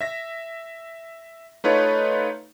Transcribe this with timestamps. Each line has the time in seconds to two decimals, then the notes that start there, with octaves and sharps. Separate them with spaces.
0.01 E5 A#6
1.64 A3 D#4 F4 B4 C#5